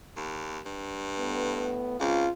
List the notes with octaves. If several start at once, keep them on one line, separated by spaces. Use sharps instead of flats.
D#2
G2
A2 A3 B3
C#2 C#3 C4 F4